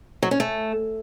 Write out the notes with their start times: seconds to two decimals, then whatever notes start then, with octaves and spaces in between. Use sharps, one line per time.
0.23 F#3
0.31 C#4
0.40 A3